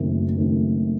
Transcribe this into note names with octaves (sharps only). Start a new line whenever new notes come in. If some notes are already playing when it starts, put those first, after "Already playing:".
Already playing: F#1 F#2 D#3 A3 C4
F#1 F#2 D#3 A3 C4